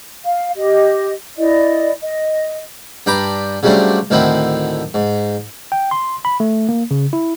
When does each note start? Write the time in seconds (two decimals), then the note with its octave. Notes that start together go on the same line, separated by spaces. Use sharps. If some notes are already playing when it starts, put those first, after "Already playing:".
0.24 F5
0.57 G4 D#5
1.37 E4 D5 D#5
2.02 D#5
3.06 G2 D4 G5 A#5 B5 D6
3.63 C#3 F#3 G3 A3 C4 D4
4.10 D2 A2 D#3 C4 E4 F#5
4.94 G#2
5.72 G5
5.91 C6
6.25 B5
6.40 A3
6.69 A#3
6.91 C#3
7.13 E4